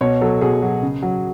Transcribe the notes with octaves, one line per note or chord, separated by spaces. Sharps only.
B2 C#5
F#3 A4
B2 G#4
F#3
C#3
F#3